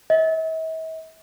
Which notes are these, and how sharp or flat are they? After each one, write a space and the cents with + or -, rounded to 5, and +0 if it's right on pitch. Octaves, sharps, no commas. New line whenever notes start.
E5 -45